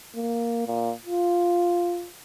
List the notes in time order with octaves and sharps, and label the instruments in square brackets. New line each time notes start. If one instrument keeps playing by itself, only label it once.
[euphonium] A#3
A#2
F4